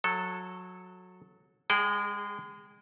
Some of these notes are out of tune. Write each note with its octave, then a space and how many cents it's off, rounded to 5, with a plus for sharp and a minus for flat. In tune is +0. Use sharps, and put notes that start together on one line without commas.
F#3 -20 A4 +0
G#3 -30 G#4 +0 G5 -25